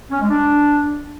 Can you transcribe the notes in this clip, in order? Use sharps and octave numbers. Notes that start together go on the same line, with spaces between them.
C#4
G#3
D4